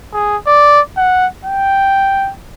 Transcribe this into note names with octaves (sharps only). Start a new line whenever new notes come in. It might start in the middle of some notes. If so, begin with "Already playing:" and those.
G#4
D5
F#5
G5